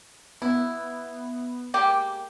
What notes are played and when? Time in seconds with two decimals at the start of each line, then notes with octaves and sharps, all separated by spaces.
0.42 B3 E4
1.74 G#3 A#3 G4